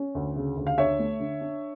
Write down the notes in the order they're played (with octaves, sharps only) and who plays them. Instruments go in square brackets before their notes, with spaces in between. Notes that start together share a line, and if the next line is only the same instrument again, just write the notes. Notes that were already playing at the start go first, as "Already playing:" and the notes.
Already playing: [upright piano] C#4
D2
C#3
D2
F5
D4 C#5 E5
A3
D3
D4